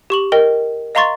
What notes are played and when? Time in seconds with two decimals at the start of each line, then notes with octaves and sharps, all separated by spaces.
0.10 G4 C#6 F#7
0.32 A#4 D#5 G5
0.95 D#5 F5 A#5 C6 C#6 A6